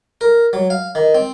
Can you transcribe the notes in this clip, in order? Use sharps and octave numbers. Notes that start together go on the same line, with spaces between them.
A#4
F#3
F5
D#3
C4